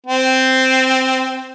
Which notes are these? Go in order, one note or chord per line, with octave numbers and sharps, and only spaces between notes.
C4